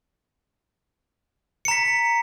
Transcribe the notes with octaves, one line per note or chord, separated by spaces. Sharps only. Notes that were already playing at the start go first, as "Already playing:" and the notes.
A#5 B6 C#7